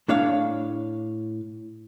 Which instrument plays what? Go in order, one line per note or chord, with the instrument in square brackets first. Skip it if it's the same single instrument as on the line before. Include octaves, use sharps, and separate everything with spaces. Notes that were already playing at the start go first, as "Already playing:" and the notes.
[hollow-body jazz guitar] A2 D4 C#5 F5